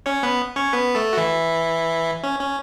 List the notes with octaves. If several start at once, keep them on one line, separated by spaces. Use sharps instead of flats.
C#4 C#5
B3 B4
C#4 C#5
B3 B4
A3 A4
F#4
E3 E4
C#4
C#4